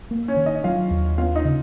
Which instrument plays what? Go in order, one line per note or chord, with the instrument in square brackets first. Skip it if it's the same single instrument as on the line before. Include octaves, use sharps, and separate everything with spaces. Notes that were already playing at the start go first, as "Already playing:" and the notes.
[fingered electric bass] A#3
[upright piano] C#4 C#5
[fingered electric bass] D#3
[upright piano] D#4 D#5
[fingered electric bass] F#3 [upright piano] F4 F5
[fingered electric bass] D#2
[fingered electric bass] B3 [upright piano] F4 F5
[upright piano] D#4 D#5
[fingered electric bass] C#3